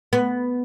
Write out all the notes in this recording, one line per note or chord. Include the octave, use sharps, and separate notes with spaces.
B3